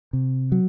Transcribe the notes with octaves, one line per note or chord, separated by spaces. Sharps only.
C3
F#3